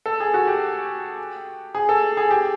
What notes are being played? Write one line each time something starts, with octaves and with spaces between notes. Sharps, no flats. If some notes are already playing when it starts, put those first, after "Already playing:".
A4
G#4
F#4
G4
G#4
A4
G#4
G4